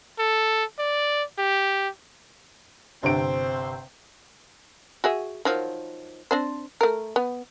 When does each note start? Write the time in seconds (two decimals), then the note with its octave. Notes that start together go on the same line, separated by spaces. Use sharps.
0.19 A4
0.79 D5
1.38 G4
3.03 G1 C3 C4 C5 D7
5.04 F#4 G#4 E5
5.45 D#3 F3 F#3
6.31 C4 D4 C5
6.81 A3 A#4
7.16 B3